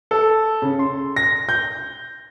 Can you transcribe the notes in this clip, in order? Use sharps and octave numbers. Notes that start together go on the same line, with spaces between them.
A4
C#3
C6
A#6
G6